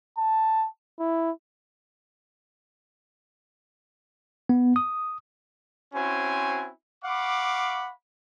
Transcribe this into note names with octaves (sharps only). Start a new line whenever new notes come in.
A5
E4
B3
D#6
C4 C#4 E4 F#4 C5 G#5
F5 F#5 B5 C#6 D6